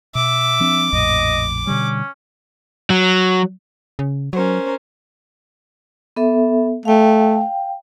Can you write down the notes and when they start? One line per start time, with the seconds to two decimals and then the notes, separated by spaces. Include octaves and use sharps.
0.15 B2 E5 D6
0.60 F3 C4 D4
0.93 A#1 F2 A2 D#5
1.67 B2 D3 G3 C#4
2.90 F#3
3.99 C#3
4.33 F#3 C#4 A#4 C5
6.16 B3 A4 E5
6.85 A3 F5 G5